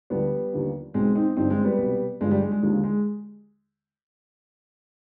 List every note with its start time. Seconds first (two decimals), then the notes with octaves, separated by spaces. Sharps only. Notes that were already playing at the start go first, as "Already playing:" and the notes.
0.10 D2 D3 F3 G3 B3
0.53 D#2 D3 F3
0.94 B1 B2 G#3 C4
1.15 C4 D#4
1.36 G1 G2 F3 C4 D#4
1.50 G#3 C4
1.64 G3 B3
1.78 C2 B2
2.21 G1 G2 F3 G#3
2.31 G3
2.41 G#3
2.52 G#3
2.63 D#2 D3 F3 G#3
2.84 G#3